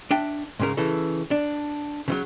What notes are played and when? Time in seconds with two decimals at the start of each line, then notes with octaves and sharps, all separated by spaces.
0.11 D4 E5 G5
0.60 G#2 C#3 A#4
0.77 C#3 E3 A4
1.31 D4
2.08 C#3 E3 F#3